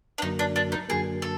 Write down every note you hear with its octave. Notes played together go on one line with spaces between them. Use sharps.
D4
F#2 D3 F#3 A#3 D#4
D4
D4
D#4
F#2 D3 F#3 A#3 G#4
A4